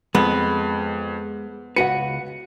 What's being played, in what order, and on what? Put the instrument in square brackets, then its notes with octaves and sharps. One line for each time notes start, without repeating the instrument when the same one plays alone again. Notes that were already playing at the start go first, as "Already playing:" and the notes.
[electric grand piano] F2 [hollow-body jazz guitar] G#3 [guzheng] B3
[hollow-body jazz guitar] C#2 F#4 B4 [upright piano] F#5 D#7 [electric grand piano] C#7